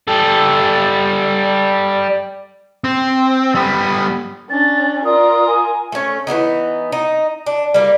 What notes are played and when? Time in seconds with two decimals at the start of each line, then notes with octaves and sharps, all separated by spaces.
0.08 G3 A4
2.84 C4
3.55 G3 B3
4.50 C#4 D4 A6
5.05 F4 A#4 D5 D#6
5.46 G#5
5.92 A3 C#4
6.27 E3 G3 B3 D#4
6.92 D#4
7.46 D4
7.74 G3 A#3